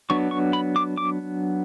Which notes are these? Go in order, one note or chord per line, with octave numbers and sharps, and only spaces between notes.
F#3 B3 D4 C#6
C#6
B5
D6
D6